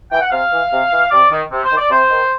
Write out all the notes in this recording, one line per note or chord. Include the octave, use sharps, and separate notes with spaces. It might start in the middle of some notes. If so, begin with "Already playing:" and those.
E3 G5
F#5
C3 F5
E3
C3
E3
C3 D5
D#3
C3
C5
D#3
D5
C3 C5
D#3